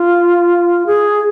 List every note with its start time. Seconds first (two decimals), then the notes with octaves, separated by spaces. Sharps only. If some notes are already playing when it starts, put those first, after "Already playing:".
Already playing: F4
0.86 G#4